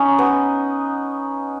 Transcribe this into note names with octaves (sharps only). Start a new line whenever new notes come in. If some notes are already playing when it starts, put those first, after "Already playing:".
Already playing: C#4 D#4
B3